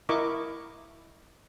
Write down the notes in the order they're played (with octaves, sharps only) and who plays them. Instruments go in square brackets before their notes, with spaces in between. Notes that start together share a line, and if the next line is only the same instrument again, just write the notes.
[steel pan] E4 A#4 D#5 C#6 D6